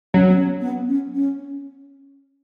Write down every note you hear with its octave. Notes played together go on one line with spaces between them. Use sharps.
F#3 C#4
B3
C#4
B3
C#4
C#4